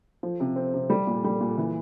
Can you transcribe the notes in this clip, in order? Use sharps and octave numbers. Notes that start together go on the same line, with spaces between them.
F3
C3
C4
C3
G3
A#2
G3
A#2
E3